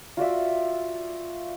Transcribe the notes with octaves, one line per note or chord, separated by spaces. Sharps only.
F4 F#4 D5 E5